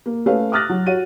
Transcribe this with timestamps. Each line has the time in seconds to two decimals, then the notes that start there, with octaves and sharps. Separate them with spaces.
0.06 A#3
0.26 A3 C#4 A4 B4 C#5 F5
0.52 D6 D#6 F6 F#6 A6 A#6
0.69 F#3
0.86 F#4 C#5 D#7